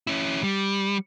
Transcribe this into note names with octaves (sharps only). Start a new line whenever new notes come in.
C#4 E4
G3